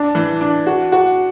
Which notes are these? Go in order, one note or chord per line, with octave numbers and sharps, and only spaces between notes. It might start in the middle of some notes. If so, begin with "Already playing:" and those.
Already playing: D4
E3
D4
F#4
F#4